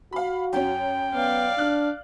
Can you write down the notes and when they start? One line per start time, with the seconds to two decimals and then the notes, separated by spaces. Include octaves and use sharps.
0.13 F#4 F5 B5
0.53 F#2 C#4 G5
1.14 B3 D5 F5
1.58 D4 F6 F#6